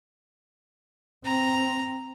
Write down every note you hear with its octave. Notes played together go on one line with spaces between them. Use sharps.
C4 A#5